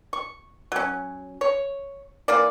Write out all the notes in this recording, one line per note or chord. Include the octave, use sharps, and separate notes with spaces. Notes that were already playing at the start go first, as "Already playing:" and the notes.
C#6
F#3 C#4
C#5
E3 A#3 D5